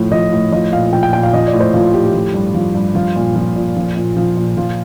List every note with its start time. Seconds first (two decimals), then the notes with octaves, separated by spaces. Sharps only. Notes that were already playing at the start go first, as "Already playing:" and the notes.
Already playing: A2 F3
0.11 F3 D#5
0.32 A2
0.52 F3 D#5
0.72 A#2 F5
0.92 F3 G5
1.03 G5
1.13 A#2 G5
1.23 F5
1.33 F3 D#5
1.47 D5
1.54 A2
1.60 C5
1.74 F3 F4
1.84 F4
1.94 A2 G4
2.04 G4
2.14 F3
2.34 G2
2.54 F3
2.75 G2
2.95 F3 F4
3.16 A#2
3.36 F3
3.56 A#2
3.76 F3
3.96 A#2
4.17 F3
4.37 A#2
4.57 F3 F4